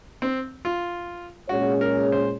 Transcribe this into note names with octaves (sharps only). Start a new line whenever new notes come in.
C4
F4
A#2 G#3 C#4 F#4 G#4 C#5
A#4
C5